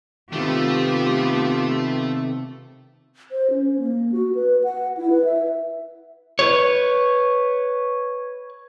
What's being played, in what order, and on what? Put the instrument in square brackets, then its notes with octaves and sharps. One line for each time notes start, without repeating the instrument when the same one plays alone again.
[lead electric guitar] C3 D#3 [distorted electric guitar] A3 [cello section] B3 F4 G4
[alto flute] C5
C#4
A#3
F#4
B4
F#5
E4
B4
E5
[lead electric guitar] B4 C#5